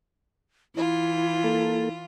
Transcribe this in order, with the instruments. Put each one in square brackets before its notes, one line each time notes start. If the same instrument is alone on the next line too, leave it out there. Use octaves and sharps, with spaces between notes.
[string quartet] E3 F4 [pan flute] E4
[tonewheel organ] A#3 A4